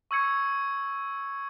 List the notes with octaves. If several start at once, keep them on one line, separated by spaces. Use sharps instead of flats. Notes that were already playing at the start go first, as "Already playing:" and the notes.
C#6 E6 G#6 C#7